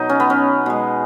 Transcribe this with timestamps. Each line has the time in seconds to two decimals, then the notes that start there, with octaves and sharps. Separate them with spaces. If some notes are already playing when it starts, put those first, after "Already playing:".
Already playing: B2 F#3 D#4
0.09 C#4
0.20 B3
0.30 C#4
0.66 B2 G#3